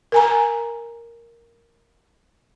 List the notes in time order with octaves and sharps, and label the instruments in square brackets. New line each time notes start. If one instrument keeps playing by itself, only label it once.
[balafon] A#4 G#5 A#5